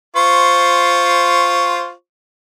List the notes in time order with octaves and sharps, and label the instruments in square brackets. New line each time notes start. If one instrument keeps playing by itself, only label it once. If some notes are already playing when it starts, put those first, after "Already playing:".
[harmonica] F4 C5 C#6